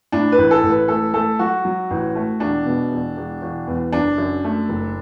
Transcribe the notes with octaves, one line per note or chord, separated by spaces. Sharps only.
A2 D4
B4
A1
A4
A1
B4
A3 A4
A3 A4
F#3 F#4
F#3
A1
A3
E1 D4
B2
E1
E1
E1
E2
F#1 D4
F#2
A3
F#1